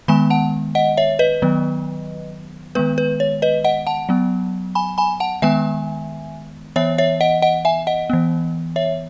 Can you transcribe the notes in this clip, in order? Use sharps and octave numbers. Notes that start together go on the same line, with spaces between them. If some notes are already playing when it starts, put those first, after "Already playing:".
D#3 G#3 B3 G#5 B5
F#5 A5
D#5 F#5
C#5 E5
B4 D#5
D#3 F#3 B3
D#3 G#3 B3 B4
B4
C#5
B4 D#5
D#5 F#5
F#5 A5
F#3 B3
G#5 B5
G#5 B5
F#5 A5
D#3 G#3 B3 E5 G#5
E3 B3 C#5 E5
C#5 E5
D#5 F#5
D#5 F#5
E5 G#5
D#5 F#5
E3 B3
C#5 E5